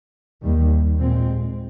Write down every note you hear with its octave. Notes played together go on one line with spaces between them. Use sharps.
D#2 D#3 G3
A#2 G#3 C4